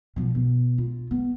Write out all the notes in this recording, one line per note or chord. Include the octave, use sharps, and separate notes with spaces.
B2 F3
B2
F4
B3